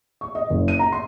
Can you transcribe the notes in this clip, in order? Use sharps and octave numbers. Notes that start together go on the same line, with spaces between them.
C#6
D#5
F#1
D#7
A#5
C6